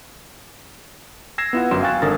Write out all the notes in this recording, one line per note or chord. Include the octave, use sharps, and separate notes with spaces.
E6 G#6 A#6 C7 E7
B3 E4 F4 F#5
G1 F#2 C6 E7
F5 G5 G#5 C#6 F#6 A6
G#1 D3 A4 A#4 D#6 A6